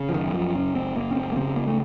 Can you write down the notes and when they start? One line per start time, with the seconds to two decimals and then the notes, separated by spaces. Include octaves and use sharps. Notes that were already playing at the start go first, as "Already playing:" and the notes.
Already playing: C#3
0.09 F3
0.13 F#2 D#3
0.34 F3
0.54 F#1 C#4
0.75 C4
0.96 F#1 A#3
1.11 C#4
1.16 C4
1.32 A#3
1.36 C#3 C4
1.56 A#3
1.67 A3